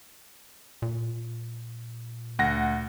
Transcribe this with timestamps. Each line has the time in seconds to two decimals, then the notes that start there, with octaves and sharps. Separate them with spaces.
0.82 A#2
2.39 D2 F#5 A#6